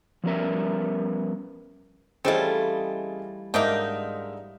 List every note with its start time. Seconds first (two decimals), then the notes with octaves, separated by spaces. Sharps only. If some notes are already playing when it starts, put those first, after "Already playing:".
0.24 F3 G3 B3 C#4 A#4 E5
2.25 E3 G3 A3 C4 C#4 F4 G#4 D#5
3.54 G#2 D3 A#3 D#4 A#4 E5 G5